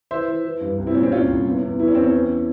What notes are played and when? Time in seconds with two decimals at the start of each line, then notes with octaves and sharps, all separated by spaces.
0.11 E3 C5 E5
0.28 E3
0.44 E3
0.61 G2
0.78 C2
0.87 C4 E4
0.95 A#2 C#4
1.03 C4 E4
1.12 C2 C#4 F4
1.28 C2
1.46 E2
1.62 E2
1.79 E3 E4
1.88 C#4
1.95 E2 C4
2.04 C#4
2.12 E3